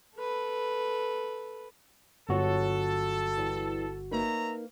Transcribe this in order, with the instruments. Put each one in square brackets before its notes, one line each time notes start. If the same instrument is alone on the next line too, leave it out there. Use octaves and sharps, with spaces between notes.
[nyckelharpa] A4 B4
[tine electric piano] G1 F#4 [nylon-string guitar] F#3 F4 C#5 [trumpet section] A4
[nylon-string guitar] E3 G3
[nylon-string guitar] A#3 D#4 B4 [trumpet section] C#5 E5 A#5